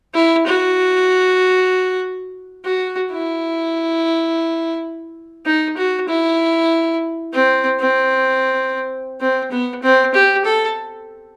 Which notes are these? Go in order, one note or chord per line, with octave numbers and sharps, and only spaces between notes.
E4
F#4
F#4
E4
D#4
F#4
E4
C4
C4
C4
B3
C4
G4
A4